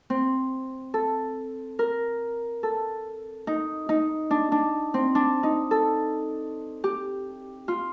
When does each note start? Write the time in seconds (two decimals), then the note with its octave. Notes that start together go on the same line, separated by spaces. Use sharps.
0.10 C4
0.94 A4
1.79 A#4
2.63 A4
3.47 D#4
3.89 D#4
4.31 D4
4.52 D4
4.94 C4
5.15 D4
5.43 D#4
5.71 A4
6.84 G4
7.68 F4